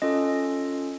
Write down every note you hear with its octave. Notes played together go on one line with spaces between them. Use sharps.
C#4 F4 A4 D#5